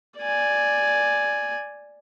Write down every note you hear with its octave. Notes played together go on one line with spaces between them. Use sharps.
D5 G#5